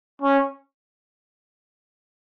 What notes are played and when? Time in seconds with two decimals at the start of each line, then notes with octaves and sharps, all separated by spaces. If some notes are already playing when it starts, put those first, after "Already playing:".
0.22 C#4